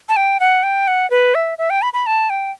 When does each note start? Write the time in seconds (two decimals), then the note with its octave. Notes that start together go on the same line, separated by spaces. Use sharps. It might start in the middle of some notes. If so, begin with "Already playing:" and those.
0.09 A5
0.16 G5
0.40 F#5
0.63 G5
0.88 F#5
1.10 B4
1.35 E5
1.58 E5
1.70 G5
1.82 B5
1.93 B5
2.06 A5
2.30 G5